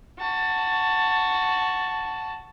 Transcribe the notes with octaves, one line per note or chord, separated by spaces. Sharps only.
F#4 A5